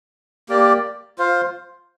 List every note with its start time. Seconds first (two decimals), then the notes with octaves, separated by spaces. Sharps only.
0.49 A#3 G4 D5
1.18 F4 C5 F5